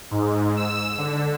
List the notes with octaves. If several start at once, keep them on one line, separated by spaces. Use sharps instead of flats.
G#2
E6
D3